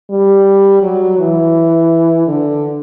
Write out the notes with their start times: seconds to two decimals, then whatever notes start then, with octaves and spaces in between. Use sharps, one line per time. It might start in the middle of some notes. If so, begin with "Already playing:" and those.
0.10 G3
0.82 F#3
1.19 E3
2.27 D3